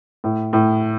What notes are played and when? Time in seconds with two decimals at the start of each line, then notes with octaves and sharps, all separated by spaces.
0.24 A2
0.53 A2